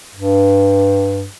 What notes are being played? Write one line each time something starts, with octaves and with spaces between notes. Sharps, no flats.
G2